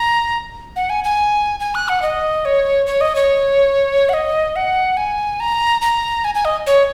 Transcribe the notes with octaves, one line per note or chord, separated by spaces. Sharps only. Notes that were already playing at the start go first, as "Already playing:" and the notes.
Already playing: A#5
F#5
G#5
G#5
G#5
F#6
F#5
D#5
C#5
C#5
D#5
C#5
F#5
D#5
F#5
G#5
A#5
A#5
G#5
G#5
D#5
C#5